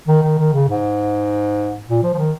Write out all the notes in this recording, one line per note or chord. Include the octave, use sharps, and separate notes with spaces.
D#3
D#3
D#3
C#3
G#2
A#2
F3
F3
D#3